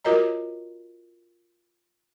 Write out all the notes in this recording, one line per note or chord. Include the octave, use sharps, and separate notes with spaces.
F4 F#4 A#4 C#5 D#5 A#5